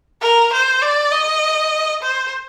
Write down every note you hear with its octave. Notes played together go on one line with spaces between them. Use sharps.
A#4
C5
D5
D#5
C5